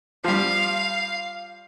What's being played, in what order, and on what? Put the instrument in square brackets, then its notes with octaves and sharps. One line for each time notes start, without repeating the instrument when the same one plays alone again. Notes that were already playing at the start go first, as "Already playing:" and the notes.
[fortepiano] F3 G3 [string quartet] F5